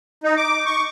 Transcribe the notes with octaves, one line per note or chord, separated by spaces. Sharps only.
D#4
D6
C#6